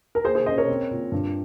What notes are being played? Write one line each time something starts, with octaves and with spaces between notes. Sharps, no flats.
A#4
A#3 G#4 C5
G#4 C5
C#4 C5 D#5
A#4 C#5
C4
A#2
G2